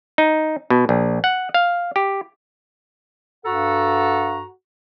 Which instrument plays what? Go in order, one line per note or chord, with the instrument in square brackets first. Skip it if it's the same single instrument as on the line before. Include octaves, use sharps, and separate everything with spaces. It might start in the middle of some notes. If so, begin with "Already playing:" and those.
[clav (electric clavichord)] D#4
B2
A#1
F#5
F5
G4
[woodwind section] G2 F#4 A4 F#5 A#5